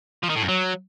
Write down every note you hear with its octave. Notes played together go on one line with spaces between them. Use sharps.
F3
D#3
A2
F#2
F#3